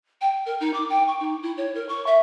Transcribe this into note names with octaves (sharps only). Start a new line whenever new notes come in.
G5
A#4
D#4
D6
G5
C#6
D#4
E4
C#5
A#4
C#6
E5